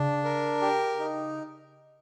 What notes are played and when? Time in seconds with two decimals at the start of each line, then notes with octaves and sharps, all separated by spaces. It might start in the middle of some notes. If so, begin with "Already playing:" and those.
Already playing: C#3 D4
0.24 A#4
0.62 G4
0.99 D#4